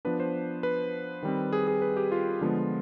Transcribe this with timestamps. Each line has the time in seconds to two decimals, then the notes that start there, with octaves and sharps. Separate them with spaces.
0.05 F3 B3 D4 B4
0.20 C5
0.63 B4
1.23 D#3 G3 C4
1.53 G#4
1.67 G#4
1.82 B4
1.97 G4
2.12 F4
2.41 D3 F3 G#3 B3